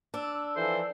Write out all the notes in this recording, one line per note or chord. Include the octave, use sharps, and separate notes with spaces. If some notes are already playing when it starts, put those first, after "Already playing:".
D4 E6
E3 F3 A4 C5